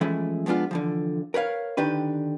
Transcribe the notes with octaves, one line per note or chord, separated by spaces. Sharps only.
E3 F3 G#3 A3 C#4 E4
F3 G#3 B3 D4 F4
D3 E3 F3
A#4 B4 C#5 F5
D3 D#3 D4 G4 B4